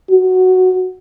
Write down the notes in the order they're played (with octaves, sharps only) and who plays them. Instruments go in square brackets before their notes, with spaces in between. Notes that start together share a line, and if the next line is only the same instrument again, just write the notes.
[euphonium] F#4